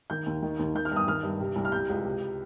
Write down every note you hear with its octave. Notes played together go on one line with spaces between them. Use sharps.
D#3 G6
D#2
D#3
D#2
D#3 G6
F6
G2 D#6
D#3 F6
G2
C3
C2
F6
C3 G6
C#2
C3